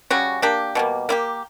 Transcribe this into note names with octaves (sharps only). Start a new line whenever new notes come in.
C#3 G3 C#4 F#4
A#3 D4 G4
B2 G3 A#3
A#3 E4 G4